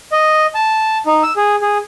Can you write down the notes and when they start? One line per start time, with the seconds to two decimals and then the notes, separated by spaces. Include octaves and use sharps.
0.12 D#5
0.55 A5
1.06 D#4
1.23 E6
1.36 G#4
1.62 G#4